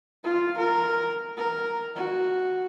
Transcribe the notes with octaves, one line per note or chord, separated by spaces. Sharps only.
F4
A#4
A#4
F#4